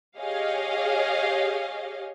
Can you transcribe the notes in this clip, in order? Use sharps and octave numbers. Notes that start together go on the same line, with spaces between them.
G4 G#4 C#5 D#5 F5